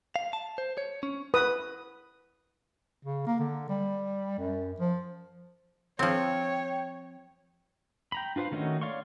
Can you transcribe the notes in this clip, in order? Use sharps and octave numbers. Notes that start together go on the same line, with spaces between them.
F5
A5
C5
C#5
C#4
B4 D#6
C#3
A#3
D3
G3
F#2
F3
F3 C4 C#5 G5
G5 A#5 B5
D4 F4 B4 C5 F5
D#3 A3 C#4 D#4 F#4
C#5 D5 F5 C6 C#6